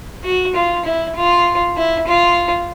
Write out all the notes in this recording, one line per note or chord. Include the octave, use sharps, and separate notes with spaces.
F#4
F4
E4
F4
E4
F4